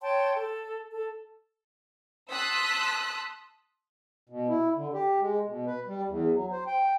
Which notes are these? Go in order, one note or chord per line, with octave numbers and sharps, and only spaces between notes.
C#5 G5 A5 C6
A4
A4
A5 C6 D#6 E6 F#6 B6
B2
E4
D3
G4
G#3
B2
B4
G3
E2
F#3
C5
G5